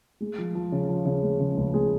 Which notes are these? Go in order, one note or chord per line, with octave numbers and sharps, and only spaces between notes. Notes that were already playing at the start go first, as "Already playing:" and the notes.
G#3
F3
F3
C#3
F3
C#3
G#3
C#3
C#2
G#3